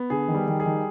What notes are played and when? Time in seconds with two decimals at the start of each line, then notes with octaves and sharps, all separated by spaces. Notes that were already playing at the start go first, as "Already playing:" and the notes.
Already playing: B3
0.10 D3 G#4
0.28 D#3
0.34 G3
0.48 D#3
0.60 G#4
0.66 D#3